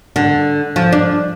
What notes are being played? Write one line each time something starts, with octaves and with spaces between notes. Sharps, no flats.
D3
F3
D4